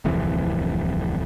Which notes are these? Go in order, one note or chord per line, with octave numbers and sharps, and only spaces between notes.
D1 C2 F2 E3